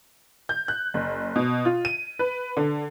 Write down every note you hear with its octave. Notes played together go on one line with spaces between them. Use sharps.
G6
F#6
F#1
B2
F4
D#7
B4
D3